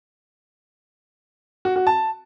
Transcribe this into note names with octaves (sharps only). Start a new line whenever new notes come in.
F#4
F#4
A5